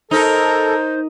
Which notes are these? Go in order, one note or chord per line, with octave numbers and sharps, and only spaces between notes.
D#4 A4 A#4 C5